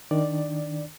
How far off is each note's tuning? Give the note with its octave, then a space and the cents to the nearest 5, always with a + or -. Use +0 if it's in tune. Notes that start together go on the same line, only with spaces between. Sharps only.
D#3 +0 D4 +0 D5 +0